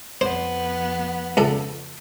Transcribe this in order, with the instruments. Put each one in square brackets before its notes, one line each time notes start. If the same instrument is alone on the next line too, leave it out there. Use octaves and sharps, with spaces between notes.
[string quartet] F2 B3 [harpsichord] C5
[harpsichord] C#2 A4